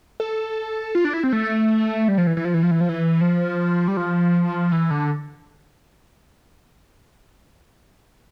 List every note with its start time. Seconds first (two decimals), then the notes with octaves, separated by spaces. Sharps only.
0.20 A4
0.95 F4
1.04 D4
1.13 E4
1.24 C4
1.33 A3
2.08 G3
2.18 F3
2.27 E3
2.37 E3
2.45 F3
2.54 E3
2.63 F3
2.71 E3
2.81 F3
2.89 E3
3.21 F3
3.88 G3
3.97 F3
4.72 E3
4.91 D3